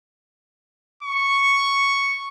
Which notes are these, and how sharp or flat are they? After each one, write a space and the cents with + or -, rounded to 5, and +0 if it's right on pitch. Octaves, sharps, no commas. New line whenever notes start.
C#6 +0